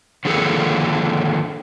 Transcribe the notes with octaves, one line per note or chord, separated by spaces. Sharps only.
D3 D#3 F3 A#3 G#4 A4